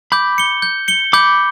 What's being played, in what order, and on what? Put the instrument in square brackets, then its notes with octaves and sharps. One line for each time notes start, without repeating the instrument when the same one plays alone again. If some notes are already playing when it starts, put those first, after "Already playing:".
[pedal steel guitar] B5 D6 [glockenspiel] G6
[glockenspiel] C#7 G7
G6
C#7 G7
[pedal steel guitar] B5 D6 [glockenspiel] G6